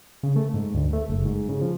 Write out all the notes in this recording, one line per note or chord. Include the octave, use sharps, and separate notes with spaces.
C#3
A3
G#2
D2
A3
F#1
G#2
C#3
F3